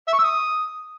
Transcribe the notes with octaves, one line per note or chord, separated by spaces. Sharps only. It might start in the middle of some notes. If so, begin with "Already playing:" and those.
E5
C#6
E6
D#6